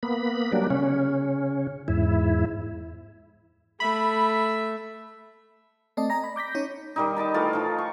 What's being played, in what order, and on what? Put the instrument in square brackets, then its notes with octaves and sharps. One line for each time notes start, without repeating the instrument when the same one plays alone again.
[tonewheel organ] A#3 B3 B5
F#3 G3 A#3 D4
C#3 C#4
E2 G#2 E4
[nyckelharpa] A3 E5 [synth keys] B5
[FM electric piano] A3 C4 D5 D#5 A5
D#5 G#5 A#5 A#6
B5
D6 G6 A#6 B6
C#4 D#4 C#5
[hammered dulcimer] D#3 G3 D#4
D#5 G5 A5 B5
E3 A3 F4
F3 D#4
C#6